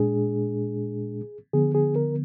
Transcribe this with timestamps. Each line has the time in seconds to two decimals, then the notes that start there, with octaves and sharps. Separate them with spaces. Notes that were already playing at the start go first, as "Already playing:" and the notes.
Already playing: A#2 G#3 D4 G#4
1.53 D3 F3 B3 G#4
1.75 G#4
1.96 A#4